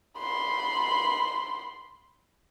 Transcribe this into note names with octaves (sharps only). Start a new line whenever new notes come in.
B5 C6